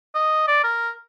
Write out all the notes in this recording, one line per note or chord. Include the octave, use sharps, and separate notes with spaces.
D#5
D5
A#4